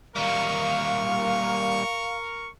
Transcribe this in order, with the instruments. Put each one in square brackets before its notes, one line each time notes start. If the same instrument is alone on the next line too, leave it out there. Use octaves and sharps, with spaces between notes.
[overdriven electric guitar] G3 A#3 [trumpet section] A#4 C#6 [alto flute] F5